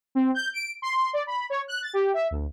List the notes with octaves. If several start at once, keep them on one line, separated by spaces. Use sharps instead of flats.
C4
G6
D7
C6
D5
B5
C#5
F#6
A6
G4
E5
D2